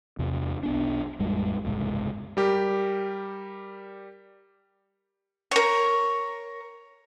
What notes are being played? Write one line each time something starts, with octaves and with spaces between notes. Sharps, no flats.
E2 C3
B1 B3 D4
A1 F2 G3 G#3
F#1 C2 G#2
G3 G4 A#4
A#4 C#5